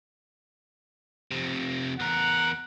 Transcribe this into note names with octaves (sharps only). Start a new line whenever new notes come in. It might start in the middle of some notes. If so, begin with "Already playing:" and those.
F2 C3
E2 A#4 F#5